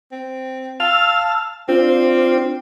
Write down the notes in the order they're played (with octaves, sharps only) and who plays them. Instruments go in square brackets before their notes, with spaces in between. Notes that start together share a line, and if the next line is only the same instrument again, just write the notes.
[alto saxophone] C4
[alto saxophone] F5 [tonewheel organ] A5 E6 F6
[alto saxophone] C4 [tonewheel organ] D4 F4 C5